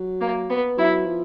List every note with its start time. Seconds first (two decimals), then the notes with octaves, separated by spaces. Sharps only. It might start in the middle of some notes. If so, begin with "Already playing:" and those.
Already playing: F#3
0.21 A#3
0.50 B3
0.77 F#3 E4
1.05 F3